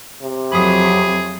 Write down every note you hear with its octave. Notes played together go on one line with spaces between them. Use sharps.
C3
F2 F#3 G#4 B5 D#6